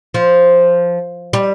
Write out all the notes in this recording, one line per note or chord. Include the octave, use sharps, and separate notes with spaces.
F3
G3